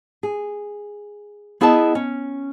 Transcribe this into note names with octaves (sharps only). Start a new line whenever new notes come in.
G#4
B3 E4 G#4 D#5 A5
C#4